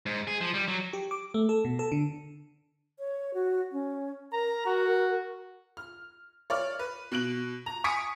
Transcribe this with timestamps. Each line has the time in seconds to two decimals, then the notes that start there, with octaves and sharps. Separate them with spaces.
0.06 G#2
0.27 G#4
0.41 F3
0.54 G3
0.68 F#3
0.93 G4
1.11 D6
1.34 A3
1.49 A4
1.65 B2
1.79 A4
1.92 D3
2.99 C#5
3.34 F#4
3.72 C#4
4.33 A#4 A#5
4.66 F#4
5.77 F6
6.50 C#5 D5 F6
6.79 B4
7.12 B2 F#6 D7 F#7
7.66 A#5
7.84 G#5 C#6 D#6 B6 C#7 D7